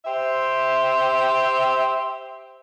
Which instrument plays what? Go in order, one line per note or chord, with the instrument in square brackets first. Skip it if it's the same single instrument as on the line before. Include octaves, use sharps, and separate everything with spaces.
[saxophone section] G4 C5 E5